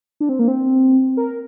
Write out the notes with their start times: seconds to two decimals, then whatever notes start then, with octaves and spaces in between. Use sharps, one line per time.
0.20 D4
0.29 C4
0.39 A#3
0.48 C4
1.17 A#4